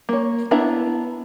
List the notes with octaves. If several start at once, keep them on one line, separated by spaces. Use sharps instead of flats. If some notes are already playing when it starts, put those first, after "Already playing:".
A#3 C#5
B3 D4 E4 E5 A#5